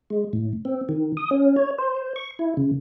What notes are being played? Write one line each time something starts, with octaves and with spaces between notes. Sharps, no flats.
G#3
A2
C4
D#3
D#6
C#4
C#5
C5
C#6
E4
C#3